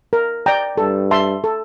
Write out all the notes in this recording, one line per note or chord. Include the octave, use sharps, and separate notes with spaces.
A#4
D5 G5 A#5
G2 A4
E5 A5 C6
A4